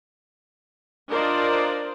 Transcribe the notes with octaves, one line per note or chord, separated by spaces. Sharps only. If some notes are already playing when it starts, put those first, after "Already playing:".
D4 F4 A#4 C5 D5 D#5